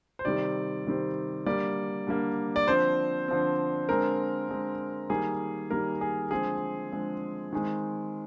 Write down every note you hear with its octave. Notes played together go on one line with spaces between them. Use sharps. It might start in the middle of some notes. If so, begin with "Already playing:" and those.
C5
C3 D#3 G3 C4 D5
C3 D#3 G3 C4
D3 G3 A#3 D5
D3 G3 A#3
D5
D3 F3 C4 C5
D3 F3 C4
D3 G#3 C4 A#4
D3 G#3 C4
D#3 G3 A#3 G#4
D#3 G3 A#3 A#4
G#4
D3 F3 G#3 C4 G#4
D3 F3 G#3 C4
D#3 G#3 C4